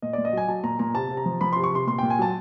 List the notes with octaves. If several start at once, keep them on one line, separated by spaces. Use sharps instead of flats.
A#2 D#5
A#2 D5
D#5
F#3 G#5
F#3 A5
A#2 A#5
A#2 A#5
C3 A5
C3
A#5
F3
F3 B5
C3 C6
C#6
C3 C6
A#2 C6
A#2 G5
G#5
F#3 A5